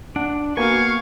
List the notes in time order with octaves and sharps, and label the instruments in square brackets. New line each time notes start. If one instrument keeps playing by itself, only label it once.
[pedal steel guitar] D4 [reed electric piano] F#5
[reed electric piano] A#3 B3 [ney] F#4 [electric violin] F5 C#6 [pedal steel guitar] G#5